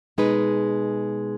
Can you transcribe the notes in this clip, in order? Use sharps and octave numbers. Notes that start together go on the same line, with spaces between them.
B2 G#3 D#4 G#4 B4